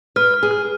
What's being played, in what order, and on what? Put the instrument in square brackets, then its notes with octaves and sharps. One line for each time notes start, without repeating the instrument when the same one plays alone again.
[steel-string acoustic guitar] B4 [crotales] F6
[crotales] F6
[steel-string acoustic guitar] G#4
[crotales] F6